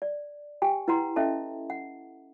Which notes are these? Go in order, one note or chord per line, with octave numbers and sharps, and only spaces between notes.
D5
G4 G5 G#5
E4 B4 F#5 A#5 C6
C#4 A4 D#5 E5 A5
F#5